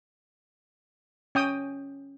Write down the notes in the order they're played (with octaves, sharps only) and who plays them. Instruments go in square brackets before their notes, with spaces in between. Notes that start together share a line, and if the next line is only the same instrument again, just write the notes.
[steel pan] C#4 G5 D#6